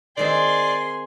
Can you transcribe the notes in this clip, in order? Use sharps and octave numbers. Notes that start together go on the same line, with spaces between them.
D#3 G#3 C4 G#4 D5 C6